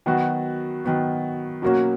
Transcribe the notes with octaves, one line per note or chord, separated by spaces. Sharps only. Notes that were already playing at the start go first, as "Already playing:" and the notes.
D#3 F#3 B3 F#4
D#3 F#3 B3 F#4
B2 F#3 A#3 C#4 F#4